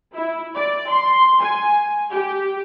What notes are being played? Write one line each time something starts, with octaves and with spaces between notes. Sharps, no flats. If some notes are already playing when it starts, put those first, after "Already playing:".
E4
D5
C6
G#5
G4